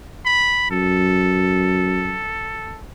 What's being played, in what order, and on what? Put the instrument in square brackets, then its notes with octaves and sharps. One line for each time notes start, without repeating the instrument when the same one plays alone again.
[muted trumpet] B5
[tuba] F#2 [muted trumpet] A4